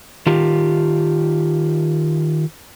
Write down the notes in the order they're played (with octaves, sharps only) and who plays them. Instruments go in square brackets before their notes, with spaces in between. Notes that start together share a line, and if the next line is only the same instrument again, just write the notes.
[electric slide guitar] D#3 F4 G4